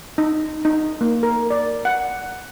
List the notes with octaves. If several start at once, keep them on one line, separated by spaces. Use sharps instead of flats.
D#4
D#4
A#3
A#4
D5
F#5